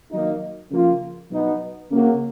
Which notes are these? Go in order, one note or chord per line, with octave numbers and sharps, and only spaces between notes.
D#3 F#3 A#3 D#4
C#3 F3 A#3 F4
B2 F#3 B3 D#4
C#3 F#3 A#3